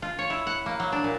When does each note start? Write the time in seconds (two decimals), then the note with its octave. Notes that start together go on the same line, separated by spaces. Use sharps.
0.02 F4
0.19 C#5
0.30 E4
0.47 F#5
0.66 A#3
0.80 F#3
0.92 D4
1.04 A#2